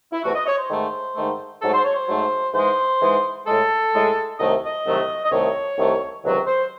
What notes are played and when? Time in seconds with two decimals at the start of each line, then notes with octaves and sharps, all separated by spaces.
0.12 E4
0.23 E2 C3 E3 A3 F#4
0.35 D#5
0.46 C#5
0.58 C5
0.69 G#2 D#3 A3
1.15 G#2 D#3 A3
1.61 G#2 F#3 A3 A4
1.73 C5
1.84 C#5
1.96 C5
2.08 G#2 F#3 A3
2.53 G#2 E3 G#3 C5
3.00 G#2 E3 G#3
3.45 A2 G#3 A4
3.93 A2 G#3
4.38 C2 C3 D#3 F#3 A3 D#5
4.65 D#5
4.85 C2 C3 D#3 F#3 A3
5.24 D#5
5.31 C2 C3 D#3 A3 C#5
5.77 C2 C3 D#3 A3
6.23 C#2 C3 D#3 F#3
6.46 C5